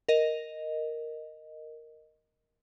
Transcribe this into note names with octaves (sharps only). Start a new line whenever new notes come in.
A#4 D#5